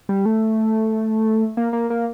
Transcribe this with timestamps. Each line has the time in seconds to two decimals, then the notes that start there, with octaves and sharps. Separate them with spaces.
0.09 G3
0.26 A3
1.57 A#3
1.73 A#3
1.90 A#3